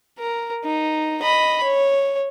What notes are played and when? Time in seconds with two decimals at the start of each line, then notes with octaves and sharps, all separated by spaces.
0.19 A#4
0.65 D#4
1.22 D#5 B5
1.64 C#5